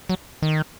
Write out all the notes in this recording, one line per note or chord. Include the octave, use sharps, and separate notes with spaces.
F#3
D#3